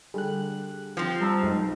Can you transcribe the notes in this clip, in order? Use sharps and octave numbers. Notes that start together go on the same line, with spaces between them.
D3 G3 G#4 F#6
F3 C4
G3 A5 A#5 E6
B1 G#3 D#5